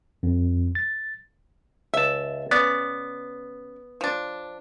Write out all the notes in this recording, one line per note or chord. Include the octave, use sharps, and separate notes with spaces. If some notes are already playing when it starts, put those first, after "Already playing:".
F2
A6
C#2 E5 A5
C#3 B3 D5
F3 D4